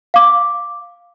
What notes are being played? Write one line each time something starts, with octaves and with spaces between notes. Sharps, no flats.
F5 D6